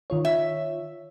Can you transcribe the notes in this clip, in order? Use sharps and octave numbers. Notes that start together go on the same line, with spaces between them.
D#3 F4 C#5
E5